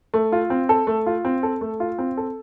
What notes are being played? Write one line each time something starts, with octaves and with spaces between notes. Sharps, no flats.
A3
F4
C4
A4
A3
F4
C4
A4
A3
F4
C4
A4